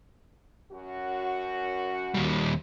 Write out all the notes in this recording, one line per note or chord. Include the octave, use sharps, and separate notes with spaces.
F#2 F#4
D#2 G3